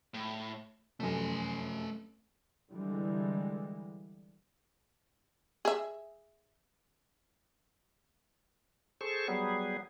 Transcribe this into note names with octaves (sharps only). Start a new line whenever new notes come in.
A2
F1 F#2 A3 G#5
D3 E3 G3 G#3
G#4 E5
G#4 A4 C5 C#6
F#3 G3 B3 G#4